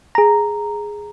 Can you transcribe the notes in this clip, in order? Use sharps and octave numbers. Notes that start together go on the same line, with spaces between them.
G#4 A#5